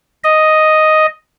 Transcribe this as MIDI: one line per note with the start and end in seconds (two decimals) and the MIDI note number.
0.24 1.06 75